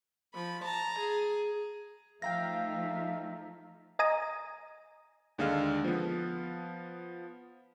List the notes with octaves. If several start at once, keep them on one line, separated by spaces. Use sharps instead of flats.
F3 B5
A5 A#5
G#4
F3 A3 D#4 E5 F5 G5 A#5 A#6
D#5 G#5 A#5 D#6
D#2 D3 G#3 A4 F5 F6
F3 B3